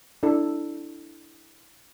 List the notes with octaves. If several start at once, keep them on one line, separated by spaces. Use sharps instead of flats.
D4 E4 A4